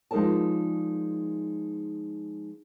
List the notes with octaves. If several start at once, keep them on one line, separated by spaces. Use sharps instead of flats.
F3 G#3 D#4 A#4 D5 A5